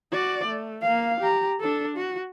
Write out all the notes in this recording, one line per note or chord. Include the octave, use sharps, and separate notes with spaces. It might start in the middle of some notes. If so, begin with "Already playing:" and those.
F#4 D5
A3
A#3 F5
G4 A#5
D4 A4
F#4